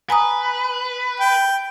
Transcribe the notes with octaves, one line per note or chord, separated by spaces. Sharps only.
B4 G#5 A#5 D#6
G5